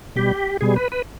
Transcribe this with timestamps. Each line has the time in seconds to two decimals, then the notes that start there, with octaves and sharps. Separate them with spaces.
0.16 B2 G3 G4
0.61 B2 G3 G#4
0.76 B4
0.92 B4